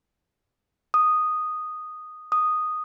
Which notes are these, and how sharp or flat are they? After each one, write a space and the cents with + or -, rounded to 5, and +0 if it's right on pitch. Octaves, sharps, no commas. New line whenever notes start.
D#6 -5
D#6 -5